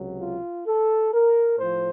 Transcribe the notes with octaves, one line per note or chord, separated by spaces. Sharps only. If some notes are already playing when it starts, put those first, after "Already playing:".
Already playing: C#2 C3 F#3
F4
A4
A#4
A2 F3 C5